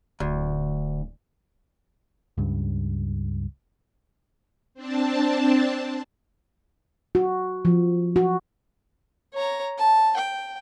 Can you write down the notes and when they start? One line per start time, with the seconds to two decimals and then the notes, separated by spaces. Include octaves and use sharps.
0.20 D1 D2
2.38 C#2 G2
4.74 C4 D4 A5
7.15 F#4
7.65 F3
8.16 F#4
9.34 C#5 A#5
9.78 A5
10.17 G5